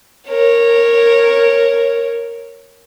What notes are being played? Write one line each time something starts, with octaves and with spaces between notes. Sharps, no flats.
A#4 C#5